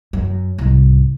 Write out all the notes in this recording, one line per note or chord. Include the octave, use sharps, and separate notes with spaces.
F#2
C2 G#2